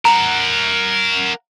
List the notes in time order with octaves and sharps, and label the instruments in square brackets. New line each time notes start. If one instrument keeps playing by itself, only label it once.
[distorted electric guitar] A#4 F#5 [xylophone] A#5